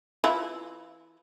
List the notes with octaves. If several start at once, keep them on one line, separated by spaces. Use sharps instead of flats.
E3 E4 F4